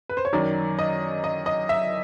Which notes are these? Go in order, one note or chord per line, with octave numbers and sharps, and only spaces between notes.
B4
C5
C#5
F#2 D#3 F#3 D5
D#5
D#5
D#5
E5